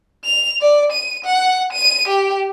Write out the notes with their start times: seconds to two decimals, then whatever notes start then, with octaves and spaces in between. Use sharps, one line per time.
0.25 F7
0.61 D5
0.92 D#7
1.25 F#5
1.72 D#7
2.08 G4